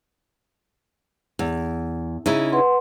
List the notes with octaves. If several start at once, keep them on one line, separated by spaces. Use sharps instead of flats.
E2
C#3 D#4 E4
B4 F#5 C6